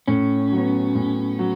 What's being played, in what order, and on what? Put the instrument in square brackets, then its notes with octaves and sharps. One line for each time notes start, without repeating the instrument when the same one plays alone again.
[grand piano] A2 [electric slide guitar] C#4
[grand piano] F#3 B3
A2
F#3